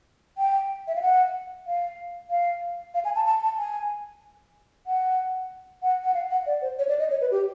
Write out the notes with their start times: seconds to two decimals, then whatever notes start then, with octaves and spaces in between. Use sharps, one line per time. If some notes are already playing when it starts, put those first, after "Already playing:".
0.38 G5
0.88 E5
0.96 F5
1.02 F#5
1.67 F5
2.30 F5
2.94 F5
3.05 G#5
3.16 A5
3.26 A5
3.42 A5
3.58 G#5
4.87 F#5
5.82 F#5
6.04 F#5
6.14 F5
6.30 F#5
6.46 D5
6.62 C5
6.79 C#5
6.89 D5
6.99 D#5
7.10 C#5
7.21 B4
7.31 G4